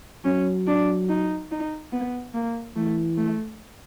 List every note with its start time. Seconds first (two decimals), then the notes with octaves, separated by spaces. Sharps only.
0.25 F#3 C#4
0.67 D4
1.09 D#4
1.51 D#4
1.92 B3
2.34 A#3
2.76 E3 A3
3.18 A3